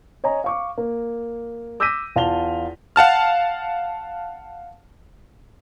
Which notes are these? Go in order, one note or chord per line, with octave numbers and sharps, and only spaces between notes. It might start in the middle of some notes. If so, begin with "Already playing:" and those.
C#5 D#5 G#5 A#5
F5 C#6 D6
A#3
D6 E6 G6 A#6 B6 D#7
E2 F4 A5 F7 G7
F5 F#5 A5 F6